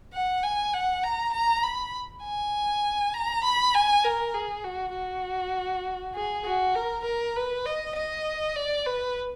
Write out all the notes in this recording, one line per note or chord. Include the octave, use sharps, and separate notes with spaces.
F#5
G#5
F#5
A#5
A#5
B5
G#5
A#5
B5
G#5
A#4
G#4
F#4
F#4
G#4
F#4
A#4
A#4
B4
D#5
D#5
D5
B4